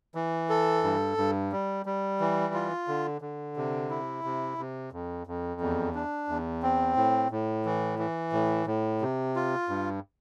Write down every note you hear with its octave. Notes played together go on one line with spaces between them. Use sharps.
E3
A4
G2
G2
G3
G3
E3
F4
D3
D3
C3
E4
C3
C3
F2
F2
E2
D4
E2
C4
A2
A2
E3
E3
A2
A2
C3
F4
G2